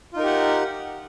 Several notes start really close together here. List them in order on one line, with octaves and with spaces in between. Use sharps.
F4 D#4 A#4 G4 F#5